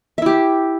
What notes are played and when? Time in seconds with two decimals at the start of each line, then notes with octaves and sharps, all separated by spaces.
0.18 E5
0.22 E4
0.26 G4